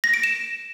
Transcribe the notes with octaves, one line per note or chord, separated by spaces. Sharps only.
A#6
D7
E7